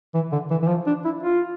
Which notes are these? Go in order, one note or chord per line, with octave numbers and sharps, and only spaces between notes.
E3
D3
E3
E3
F3
D4
E4
F4